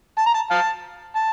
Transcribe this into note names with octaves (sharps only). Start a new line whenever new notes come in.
A5
A#5
A5
F5 A5
A5